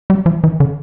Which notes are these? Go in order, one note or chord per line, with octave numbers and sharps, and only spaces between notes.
G3
F3
E3
D3